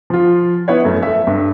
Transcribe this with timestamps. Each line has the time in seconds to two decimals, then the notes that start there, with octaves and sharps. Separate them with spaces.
0.10 F3 F4
0.68 B3 E4 B4 C#5
0.85 F#2 A3
1.03 A4 E5
1.27 G2